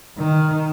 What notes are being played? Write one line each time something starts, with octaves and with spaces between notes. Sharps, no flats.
D#3